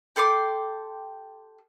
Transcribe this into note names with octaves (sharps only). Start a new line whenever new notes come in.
G4 A4 C6 D6